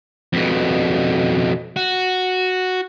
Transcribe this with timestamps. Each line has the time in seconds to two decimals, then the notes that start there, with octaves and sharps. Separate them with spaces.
0.33 F2 B2
1.76 F#4